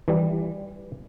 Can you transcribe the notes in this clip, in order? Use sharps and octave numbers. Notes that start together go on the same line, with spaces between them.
E3 G3